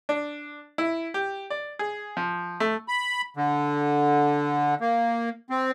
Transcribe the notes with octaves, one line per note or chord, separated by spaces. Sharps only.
D4
E4
G4
D5
G#4
F3
A3
B5
D3
A#3
C4